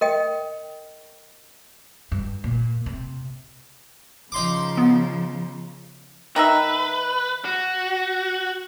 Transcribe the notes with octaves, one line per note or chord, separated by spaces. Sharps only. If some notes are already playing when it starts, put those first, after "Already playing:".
A#4 D#5 G5
G2
A#2
C3
C#3 F3 D#4 C6 D6
B3
D#3 D#4 B4 E5
F#4